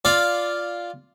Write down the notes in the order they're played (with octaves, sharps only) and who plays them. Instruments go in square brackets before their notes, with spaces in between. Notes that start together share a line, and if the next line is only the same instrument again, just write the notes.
[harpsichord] F4 D5 F5